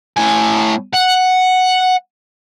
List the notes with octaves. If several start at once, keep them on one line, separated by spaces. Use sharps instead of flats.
A2 G#5
F#5